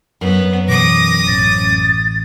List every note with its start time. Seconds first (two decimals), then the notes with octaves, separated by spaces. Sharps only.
0.21 F#2 B3
0.68 B2 E3 B3 D6 D#6 A#6
1.27 A1 A6